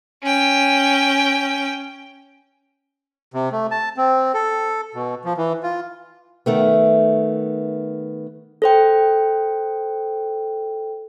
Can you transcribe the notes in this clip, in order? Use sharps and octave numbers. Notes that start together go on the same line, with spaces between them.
C#4 G5
C3
A3
A5
C4
A4
B2
F3
E3
F4
D#3 A3 B3
A4 C5 G5